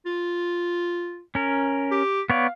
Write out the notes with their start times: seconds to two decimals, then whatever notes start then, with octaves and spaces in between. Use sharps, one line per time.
0.05 F4
1.35 C#4 A#4
1.91 G4
2.30 B3 C#5 D5 F5